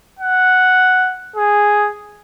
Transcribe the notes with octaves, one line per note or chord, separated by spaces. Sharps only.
F#5
G#4